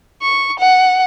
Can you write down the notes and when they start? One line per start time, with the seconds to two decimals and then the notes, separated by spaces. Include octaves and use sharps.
0.22 C#6
0.59 F#5